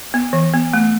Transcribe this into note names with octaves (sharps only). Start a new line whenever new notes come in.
B3
E3
B3
A3